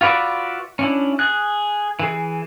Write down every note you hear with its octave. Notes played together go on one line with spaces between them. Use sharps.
F4 F#4 B4 D5 E5
C#4 D4 E4
G#4 F#6
E3 G#4